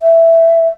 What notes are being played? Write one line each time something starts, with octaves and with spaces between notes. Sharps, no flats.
E5